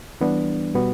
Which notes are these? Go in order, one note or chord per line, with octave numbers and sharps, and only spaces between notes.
E3 G3 B3 D4
B2 G3 B3 F#4